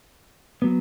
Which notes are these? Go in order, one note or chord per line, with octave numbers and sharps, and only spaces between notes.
F#3 B3